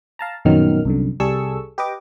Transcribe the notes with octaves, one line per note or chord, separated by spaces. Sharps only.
F5 A5 A#5
A#1 F#2 B2 D#3 F#3 F6
C2 F#2 D3
C2 G3 G#4 A4 C#6 E6
G4 B4 D#5 D6